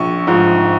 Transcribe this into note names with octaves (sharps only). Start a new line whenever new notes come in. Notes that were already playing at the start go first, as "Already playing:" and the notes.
Already playing: A#1 C#6
G#2 F3